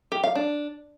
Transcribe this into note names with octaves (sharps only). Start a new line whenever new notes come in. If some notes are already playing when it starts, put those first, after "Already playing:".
G4
F5
D4